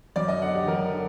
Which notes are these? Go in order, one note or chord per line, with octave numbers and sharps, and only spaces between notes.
F#2 D5
D#5
D3 F#5
G4
F#2 A#4
D3